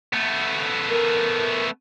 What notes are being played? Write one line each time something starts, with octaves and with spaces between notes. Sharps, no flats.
A3 B3
A#4